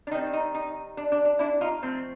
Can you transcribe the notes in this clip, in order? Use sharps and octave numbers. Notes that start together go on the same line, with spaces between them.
D4
D#3 G3 C4 D#4
D#4
D#4
D4
D4
D4
D4 E4
D#4 F4
F3 A3 C4